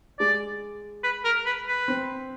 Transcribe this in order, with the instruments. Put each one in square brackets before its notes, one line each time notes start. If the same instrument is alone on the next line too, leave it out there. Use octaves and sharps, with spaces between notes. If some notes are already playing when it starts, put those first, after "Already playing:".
[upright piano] G#3 [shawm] D5
[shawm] B4
A#4
B4
B4
[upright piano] C4